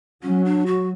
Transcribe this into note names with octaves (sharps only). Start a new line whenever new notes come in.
F#3 C#4
D4
F#4